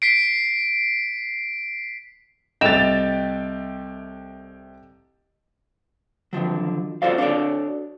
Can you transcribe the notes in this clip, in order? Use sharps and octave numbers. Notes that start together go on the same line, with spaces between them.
B6 C7 D7
C2 A3 D#5 G5 A6 E7 F7
D3 D#3 F3 F#3
F4 F#4 A4 C5 D5 F5
D4 F#4 A4 B4 C#5 D5